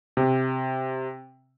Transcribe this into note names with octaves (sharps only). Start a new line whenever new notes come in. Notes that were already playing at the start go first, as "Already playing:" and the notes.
C3